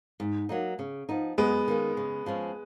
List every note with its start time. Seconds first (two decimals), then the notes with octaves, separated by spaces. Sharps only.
0.20 G#2
0.49 F#3 A#3 D#4
0.79 C#3
1.09 F3 B3 D#4
1.38 F#2 G#3 B3
1.68 D#3 A#3 C#4
1.97 C#3
2.26 F3 G#3 C#4